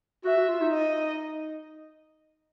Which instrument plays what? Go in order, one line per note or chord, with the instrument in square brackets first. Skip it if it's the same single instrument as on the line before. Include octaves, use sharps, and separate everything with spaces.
[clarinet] F#4 [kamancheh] E5
[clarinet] F#4
F4
D#4
[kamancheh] D#5